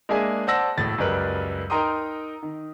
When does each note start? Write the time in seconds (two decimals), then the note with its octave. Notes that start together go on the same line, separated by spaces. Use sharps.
0.09 G#3 A#3 D4 G#4 E5 G#5
0.47 C5 D5 F#5 A5 E6 A#6
0.77 E1 A2 A6
0.98 C#2 F#2 G3 A#4 B4
1.70 D#4 A#4 G5 A#5 C6 D#6
2.43 D#3